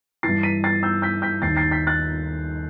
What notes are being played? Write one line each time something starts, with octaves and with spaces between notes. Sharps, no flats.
G2 E3 A6 C7
B6 D#7
A6 C7
E6 G6
G6 B6
G6 B6
D#2 D#3 A6 C7
A6 C7
G6 B6
F#6 A6